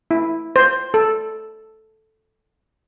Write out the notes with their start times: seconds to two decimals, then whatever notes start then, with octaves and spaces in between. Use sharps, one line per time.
0.11 E4
0.56 C5
0.94 A4